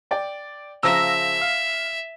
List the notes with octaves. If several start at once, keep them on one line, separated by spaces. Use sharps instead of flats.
D5 G5
C#3 F3 E5 A#5 E6 A#6
F5